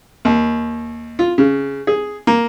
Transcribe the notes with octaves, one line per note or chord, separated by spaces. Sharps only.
D#2
F4
C#3
G#4
A#3